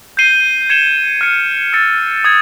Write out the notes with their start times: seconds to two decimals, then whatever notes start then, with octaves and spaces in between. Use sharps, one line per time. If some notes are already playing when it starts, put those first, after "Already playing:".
0.17 G6 C7 D#7 G7
0.70 G#6 C#7 E7 G7
1.21 F6 G#6 C#7
1.73 E6 A6 C#7
2.24 D#6 G#6